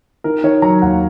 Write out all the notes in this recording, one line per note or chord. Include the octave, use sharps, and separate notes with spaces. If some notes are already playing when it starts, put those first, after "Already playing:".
D#3 A#4
D#3 C#5
F#3 A#5
D#2 F#5